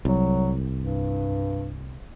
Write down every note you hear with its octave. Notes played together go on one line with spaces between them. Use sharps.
C2 F#3
G2